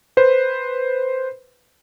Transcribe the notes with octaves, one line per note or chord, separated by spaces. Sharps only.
B4 C5